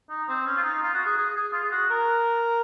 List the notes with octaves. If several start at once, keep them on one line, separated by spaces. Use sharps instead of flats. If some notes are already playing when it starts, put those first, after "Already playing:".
D#4
C4
C#4
F4
D#4
F4
F#4
G#4
G#4
G#4
F4
G#4
F#4
A#4